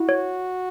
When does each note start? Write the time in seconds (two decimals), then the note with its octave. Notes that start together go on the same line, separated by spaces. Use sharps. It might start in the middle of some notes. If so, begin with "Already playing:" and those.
Already playing: E4 F#4
0.09 C#5